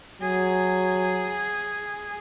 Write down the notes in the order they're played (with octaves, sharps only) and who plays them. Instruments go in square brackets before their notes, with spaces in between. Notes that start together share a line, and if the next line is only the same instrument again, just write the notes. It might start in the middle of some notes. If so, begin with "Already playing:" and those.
[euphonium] F#3 [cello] G#4